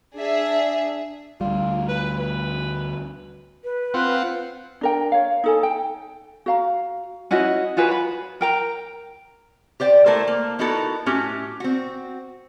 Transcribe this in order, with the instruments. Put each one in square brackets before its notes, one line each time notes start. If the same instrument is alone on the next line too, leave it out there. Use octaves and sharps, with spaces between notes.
[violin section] D4 G#4 E5
[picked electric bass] D2 G3 [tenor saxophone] F4
[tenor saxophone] B4
B4
[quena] B4
[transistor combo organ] C4 F4 F#5
[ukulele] D4 A#4 G5
C#5 F5
D#4 A4 G#5
G5
F#4 F5 A#5
C#4 E4 F#4 D#5
F4 F#4 G#4 B4
B5
A#4 G5 A#5
[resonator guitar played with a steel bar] G4 C5 D5 G5
A3 E4 A4 A#4 C5
A#3
B3 D#4 E4 F#4 A4 A#4
A2 C#4 F#4 G4
C4 F#4